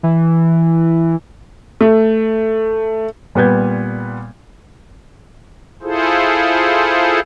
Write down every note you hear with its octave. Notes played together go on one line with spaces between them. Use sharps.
E3
A3
A#2 G3 B3 B4 G6 G#6
E4 F4 G#4 A4 C5